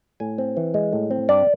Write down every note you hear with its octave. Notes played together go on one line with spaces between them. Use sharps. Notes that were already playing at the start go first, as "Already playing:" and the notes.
A2 G#5
C4
E3
G#3
A2
C4
G2 D5